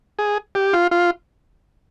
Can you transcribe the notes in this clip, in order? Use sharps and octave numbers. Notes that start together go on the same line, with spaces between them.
G#4
G4
F4
F4